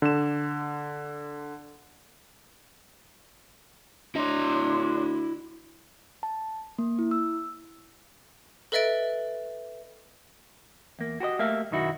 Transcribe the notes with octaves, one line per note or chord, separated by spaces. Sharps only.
D3 E7
D2 D4 E4 C#5 D#5 C6
A5
A#3
E4
E6
A4 B4 D#5 E5 A6 D7
E2 A#3
F#4 G4 C5 D#5
A3 A#3 G4 E5 F5
B1 F#2 D#3 D#4 E4 F#4